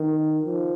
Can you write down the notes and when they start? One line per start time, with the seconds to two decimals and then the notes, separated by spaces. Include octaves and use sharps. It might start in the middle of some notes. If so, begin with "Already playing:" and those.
Already playing: D#3
0.45 F3